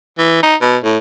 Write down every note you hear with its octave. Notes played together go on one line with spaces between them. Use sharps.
E3
D#4
B2
A2